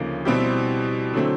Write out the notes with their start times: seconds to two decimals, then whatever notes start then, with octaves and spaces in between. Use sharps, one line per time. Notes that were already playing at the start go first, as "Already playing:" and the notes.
Already playing: D2 C#3 F3 A#3 D#4
0.25 B2 G3 C4 E4 G4
1.14 D3 F#3 A3 C4